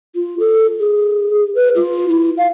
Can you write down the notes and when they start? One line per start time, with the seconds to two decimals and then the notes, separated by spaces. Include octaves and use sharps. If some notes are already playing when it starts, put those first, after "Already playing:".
0.15 F4
0.39 A4
0.80 G#4
1.55 B4
1.76 F4
2.09 E4
2.38 F5